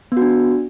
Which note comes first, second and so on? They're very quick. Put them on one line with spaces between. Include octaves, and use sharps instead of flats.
B3 F#4 D4